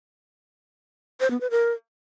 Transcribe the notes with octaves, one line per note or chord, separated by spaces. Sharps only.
C5
B3
B4
A#4